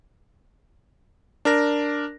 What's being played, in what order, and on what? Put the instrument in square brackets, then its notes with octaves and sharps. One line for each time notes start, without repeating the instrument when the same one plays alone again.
[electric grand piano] D4 A#4 A#6